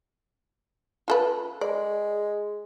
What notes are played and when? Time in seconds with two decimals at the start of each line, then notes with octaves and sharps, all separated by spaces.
1.08 F4 A4 B4
1.61 G#3 D5